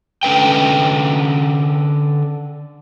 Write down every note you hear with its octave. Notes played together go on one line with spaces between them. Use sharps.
D3 C#4 B4 G5